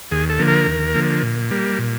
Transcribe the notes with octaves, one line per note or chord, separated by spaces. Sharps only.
D#2 G#4
A4
D3 F3 A#3
A#4
D#2
D3 F3 A#3
A#2
G3 A#3
A#2